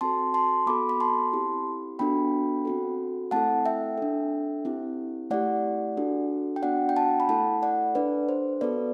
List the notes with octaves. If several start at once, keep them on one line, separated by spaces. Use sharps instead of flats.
C4 F#4 A4 A5 C6
A5 C6
B3 F#4 A4 B5 D6
B5
A5 C6
C4 E4 G4
B3 D4 F#4 A4 G5 B5
C4 F#4 A4
A3 C4 E4 A4 F#5 A5
E5 G5
D4 A4
C4 E4 G4
A3 E4 G4 D5 F#5
D4 F#4 A4
G5
B3 D4 F#4 D5 F#5
G5
F#5 A5
B5
A3 E4 A4 F#5 A5
D5 F#5
D4 A4 B4 D5
C5
B3 F#4 A4 B4 D5